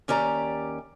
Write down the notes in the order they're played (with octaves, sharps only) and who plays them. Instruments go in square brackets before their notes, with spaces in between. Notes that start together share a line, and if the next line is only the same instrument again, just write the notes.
[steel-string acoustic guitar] D#2 C#4 G4 D5 A#5